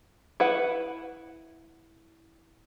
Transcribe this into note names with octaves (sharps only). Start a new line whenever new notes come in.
E4 B4 F#5